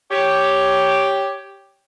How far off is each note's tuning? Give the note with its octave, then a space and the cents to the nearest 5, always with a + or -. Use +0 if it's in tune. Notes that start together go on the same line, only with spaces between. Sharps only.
G4 +0 C#5 +5